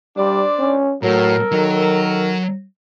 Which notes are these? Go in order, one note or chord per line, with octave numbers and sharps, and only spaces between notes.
G3 D4 C5 D5
C#4
A2 F#3 A4 A#4
D#3 F#3